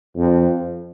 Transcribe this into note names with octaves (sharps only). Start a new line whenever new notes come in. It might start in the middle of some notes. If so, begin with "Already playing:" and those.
F2